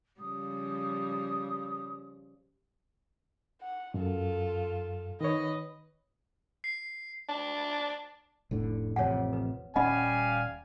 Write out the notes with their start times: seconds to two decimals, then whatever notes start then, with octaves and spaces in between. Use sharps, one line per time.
0.20 C#3 F3 G3 D#6
3.61 F#5
3.94 F#2 F4 A4
5.21 D#3 B4 C#5 D#5
6.64 C7
7.28 D4
8.51 F1 A2 D3
8.96 A1 F2 C3 C#5 F#5
9.33 B4
9.76 D#1 G3 C#4 D#5 F5 F#5 G#5 B5